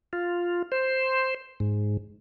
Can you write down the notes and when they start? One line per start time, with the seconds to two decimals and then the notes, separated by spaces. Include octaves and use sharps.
0.13 F4
0.72 C5
1.60 G#2